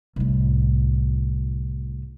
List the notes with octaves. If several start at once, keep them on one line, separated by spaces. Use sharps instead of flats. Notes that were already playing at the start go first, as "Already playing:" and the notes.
C2 A2